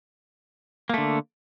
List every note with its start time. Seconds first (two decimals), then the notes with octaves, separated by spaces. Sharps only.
0.89 A#3
0.94 A3
0.98 D3